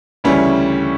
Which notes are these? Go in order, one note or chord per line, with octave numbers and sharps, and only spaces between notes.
D2 C#3 E3 G3 C#4